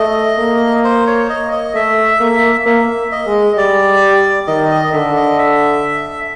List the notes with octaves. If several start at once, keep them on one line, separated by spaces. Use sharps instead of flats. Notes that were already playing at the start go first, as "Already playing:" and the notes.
Already playing: A3 D#5
A#3
C5
C#5
D#5
D#5
A3 E5
A#3
A#3 E5
D#5
G#3
G3 D5
D#3 D#5
D#5
D3 E5
D#5
E5